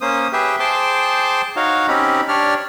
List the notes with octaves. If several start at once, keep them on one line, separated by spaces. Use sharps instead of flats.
A#3 C#4 C5 D#6
G4 G#4 B4 E5 G5
G#4 C5 G5 A5 C6 D6
D#4 F#4 C#5 F5
C4 C#4 D#4 G4 B5
D4 G4 C#5 D5 F6